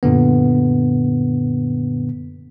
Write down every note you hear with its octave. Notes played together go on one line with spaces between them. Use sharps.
F#2 A#2 D3 B3